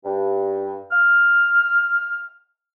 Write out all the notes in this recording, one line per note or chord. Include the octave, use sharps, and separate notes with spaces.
G2
F6